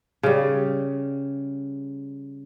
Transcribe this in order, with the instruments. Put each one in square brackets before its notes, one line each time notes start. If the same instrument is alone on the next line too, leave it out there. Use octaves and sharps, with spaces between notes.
[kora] C#3 G3